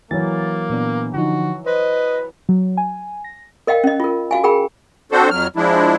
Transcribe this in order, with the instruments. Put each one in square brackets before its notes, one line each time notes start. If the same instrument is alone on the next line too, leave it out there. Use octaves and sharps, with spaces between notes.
[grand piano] E3 F#3 [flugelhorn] A#3 [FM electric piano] A6
[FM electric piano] A#2 B3 D4
[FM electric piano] D3 F3 D#4 [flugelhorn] F#4
[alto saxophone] B4 [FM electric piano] C5 [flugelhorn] D#5
[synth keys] F#3
G#5
A#6
[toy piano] A#4 D#5 F5 G5
C#4 D#5
F4 A#4
F#4 F5 G#5
G#4 A#4 G5 B5
[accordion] C4 D4 F#4 A4 C5
F2 F#3 F6
F3 G#3 D4 E4